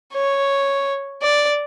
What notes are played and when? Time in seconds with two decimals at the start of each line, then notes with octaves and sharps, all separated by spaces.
0.13 C#5
1.22 D5